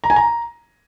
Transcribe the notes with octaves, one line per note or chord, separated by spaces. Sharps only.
A#5
G#5
A#5